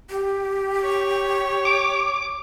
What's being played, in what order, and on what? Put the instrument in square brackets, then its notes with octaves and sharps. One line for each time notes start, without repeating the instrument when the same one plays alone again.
[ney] G4
[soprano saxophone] C#5
[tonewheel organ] D6